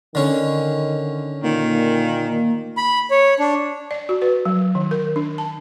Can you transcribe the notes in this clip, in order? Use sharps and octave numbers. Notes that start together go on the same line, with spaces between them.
D3 D#3 C#4
A#2 D#3 A#3
B5
C#5
D4
D5
F#4
B4
F#3
D#3
A#4
D4
A5